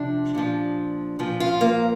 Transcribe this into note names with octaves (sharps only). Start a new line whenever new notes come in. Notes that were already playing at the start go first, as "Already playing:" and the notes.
Already playing: C3 F3 D4
A#2 F3
A#2 F3
F4
A#3